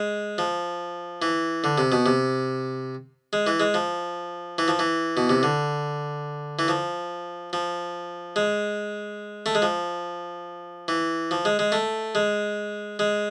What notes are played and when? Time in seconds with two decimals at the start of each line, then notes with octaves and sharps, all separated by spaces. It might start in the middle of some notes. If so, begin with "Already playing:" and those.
Already playing: G#3
0.38 F3
1.22 E3
1.64 D3
1.78 C3
1.92 B2
2.06 C3
3.33 G#3
3.47 E3
3.60 G#3
3.74 F3
4.58 E3
4.68 F3
4.79 E3
5.17 B2
5.30 C3
5.43 D3
6.59 E3
6.68 F3
7.53 F3
8.36 G#3
9.46 A3
9.55 G#3
9.62 F3
10.88 E3
11.31 F3
11.45 G#3
11.59 G#3
11.72 A3
12.15 G#3
12.99 G#3